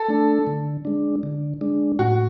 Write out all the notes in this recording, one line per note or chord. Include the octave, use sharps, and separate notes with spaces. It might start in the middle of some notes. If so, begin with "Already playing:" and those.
Already playing: A4
A3 D4
D3
G#3 D4
D3
G#3 D4
A2 F#4